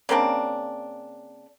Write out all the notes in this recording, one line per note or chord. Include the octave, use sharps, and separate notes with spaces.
C#3 A#3 C4 D4